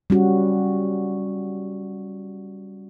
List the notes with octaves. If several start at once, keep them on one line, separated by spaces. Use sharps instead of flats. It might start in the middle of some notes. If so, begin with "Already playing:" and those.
G3 C#4 F#4